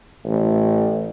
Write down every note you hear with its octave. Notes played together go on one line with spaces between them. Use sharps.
A1